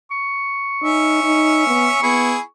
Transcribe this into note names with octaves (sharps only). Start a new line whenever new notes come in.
C#6
C#4 D#4 E5
D#4
B3
B3 E4 G#4